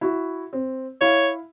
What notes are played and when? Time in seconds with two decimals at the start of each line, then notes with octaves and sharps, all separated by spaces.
0.01 E4 F#4
0.53 C4
1.01 E4 C#5 F5